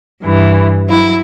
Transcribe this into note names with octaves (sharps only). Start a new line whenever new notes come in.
G2 E3
F#3 E4